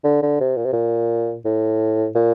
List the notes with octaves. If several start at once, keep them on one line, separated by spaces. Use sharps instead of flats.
D3
D3
C3
A#2
C3
A#2
A2
A#2